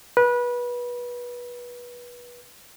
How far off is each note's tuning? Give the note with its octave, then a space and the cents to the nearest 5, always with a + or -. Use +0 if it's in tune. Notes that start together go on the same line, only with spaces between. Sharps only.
B4 -25